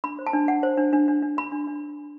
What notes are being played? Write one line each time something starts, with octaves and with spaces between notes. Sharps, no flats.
D4 B5
C5
A5
D4
D4 F#5
C5
D4
D4
D4
D4
D4 B5
D4
D4